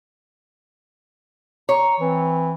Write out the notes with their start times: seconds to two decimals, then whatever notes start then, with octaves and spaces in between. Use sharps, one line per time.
1.69 C#5 A#5
2.00 E3 C4